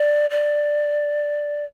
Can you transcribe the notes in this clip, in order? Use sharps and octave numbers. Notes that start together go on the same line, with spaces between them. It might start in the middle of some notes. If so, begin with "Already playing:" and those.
Already playing: D5
D5